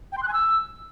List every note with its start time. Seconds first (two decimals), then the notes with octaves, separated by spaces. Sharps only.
0.12 G5
0.17 C6
0.23 F#6
0.28 G#5
0.33 E6